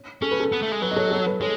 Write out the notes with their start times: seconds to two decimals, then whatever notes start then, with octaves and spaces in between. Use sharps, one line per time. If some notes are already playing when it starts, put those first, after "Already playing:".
Already playing: C#5
0.22 C#4 A4
0.31 B4
0.40 A4
0.52 B3
0.62 A3
0.72 G#3
0.82 F#3 B4
0.91 D#5
0.96 A4 C#5
1.07 D#5
1.11 A4 C#5
1.26 B4
1.41 G#3 A4 C#5